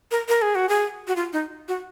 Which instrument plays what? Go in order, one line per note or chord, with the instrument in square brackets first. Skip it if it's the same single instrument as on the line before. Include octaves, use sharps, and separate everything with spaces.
[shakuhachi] A#4
A#4
G#4
F#4
G#4
F#4
F4
D#4
F#4